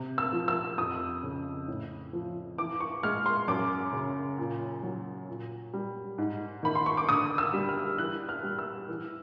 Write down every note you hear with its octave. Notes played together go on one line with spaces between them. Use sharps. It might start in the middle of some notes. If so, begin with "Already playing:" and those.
Already playing: C3
E6
F3
E6
F2 D#6
C#3
A2
F3
E3 D6
C#6
G#3 F6
C6
F#2 D6
C#3
A#2
F#3
A#2
G3
G#2
D#3 B5
C6
C#6
D6
D3 D#6
E6
G3
F6
E3 F#6
F6
G3
E6
E3